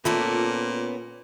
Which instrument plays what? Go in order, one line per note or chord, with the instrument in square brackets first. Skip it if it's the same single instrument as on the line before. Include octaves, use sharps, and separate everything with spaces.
[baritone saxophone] A#2 [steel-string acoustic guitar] B3 C#4 D5 [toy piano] F4 [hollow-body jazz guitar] A4 E5